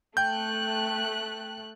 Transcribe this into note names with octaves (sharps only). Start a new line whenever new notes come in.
A3 G5 F#6 G6